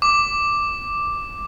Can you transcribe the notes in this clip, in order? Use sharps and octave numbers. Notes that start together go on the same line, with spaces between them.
D6